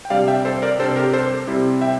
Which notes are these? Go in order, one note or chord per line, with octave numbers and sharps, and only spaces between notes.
G5
C3 G3 D4 D5 F5
E5 G5
A4 C5
A#4 D5
C3 G3 D4 A4 C5
G4 A#4
A4 C5
C3 G3 C4 E4
E5 G5